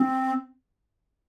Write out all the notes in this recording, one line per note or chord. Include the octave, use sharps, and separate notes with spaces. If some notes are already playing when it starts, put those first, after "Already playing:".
Already playing: C4